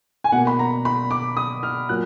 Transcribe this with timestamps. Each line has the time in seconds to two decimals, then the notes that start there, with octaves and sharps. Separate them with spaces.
0.24 G#5
0.32 B2 F#5
0.36 A#3
0.47 B5
0.59 A#5
0.85 B5
1.11 D6
1.37 D#6
1.63 F6
1.89 A#2 F#3 A#3 F#6